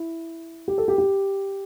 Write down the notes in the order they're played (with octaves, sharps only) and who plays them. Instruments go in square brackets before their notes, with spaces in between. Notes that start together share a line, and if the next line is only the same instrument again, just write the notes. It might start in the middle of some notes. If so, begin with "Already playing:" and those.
Already playing: [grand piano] E4
G4
A4
G4
G4